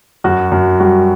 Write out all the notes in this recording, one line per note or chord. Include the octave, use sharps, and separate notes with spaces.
F#2 F#4
F#2
G3 F#4